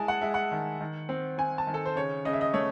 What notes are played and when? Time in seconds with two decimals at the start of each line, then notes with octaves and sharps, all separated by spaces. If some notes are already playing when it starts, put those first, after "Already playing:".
Already playing: G#3 E4 G#5 A5
0.08 F#5
0.21 G#3 E5
0.34 F#5
0.52 D#3
0.81 D#3
1.09 C4
1.38 C4 G#5
1.58 A5
1.67 D#3
1.74 A4
1.86 C5
1.96 C#3 C#5
2.25 C#3 D#5
2.33 E5
2.41 D#5
2.54 A3 C#5